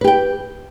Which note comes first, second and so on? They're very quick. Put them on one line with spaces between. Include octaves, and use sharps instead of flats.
B4 G4 G5